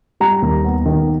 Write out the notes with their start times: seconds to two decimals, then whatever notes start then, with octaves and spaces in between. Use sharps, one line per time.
0.20 G3 A#5
0.42 D#2
0.64 B3
0.86 D#3